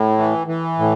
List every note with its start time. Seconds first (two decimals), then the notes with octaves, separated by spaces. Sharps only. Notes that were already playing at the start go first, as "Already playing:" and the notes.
Already playing: A2
0.18 E3
0.47 E3
0.79 A2